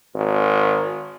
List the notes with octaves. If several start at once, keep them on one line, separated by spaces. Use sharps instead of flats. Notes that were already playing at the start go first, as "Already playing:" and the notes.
G#1